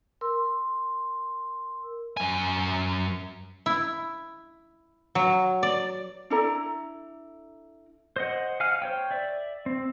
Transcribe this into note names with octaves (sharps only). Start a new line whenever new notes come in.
A#4 C6 E6
F#2 G#5
E4
F#3
D5
D4 E4 A4 A#5
C5 D#5 F#5
F5 F#5 G#5 F6
C5 C#5 G5
D5 E5
C4